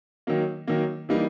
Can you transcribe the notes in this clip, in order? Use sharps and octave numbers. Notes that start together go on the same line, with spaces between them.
D#3 F#3 A#3
D#3 F#3 A#3
E3 G3 A#3 D#4